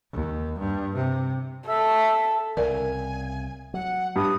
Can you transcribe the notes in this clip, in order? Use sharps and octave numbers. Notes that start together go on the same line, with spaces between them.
D#2
G2
C3
A4 E5 E6
C2 C#3 A#4 D5 G#5
F#3 F#5
G2 D#6